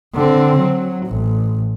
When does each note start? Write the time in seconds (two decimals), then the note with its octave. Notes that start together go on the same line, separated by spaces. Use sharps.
0.15 D3 C4
0.60 F#3
1.07 A1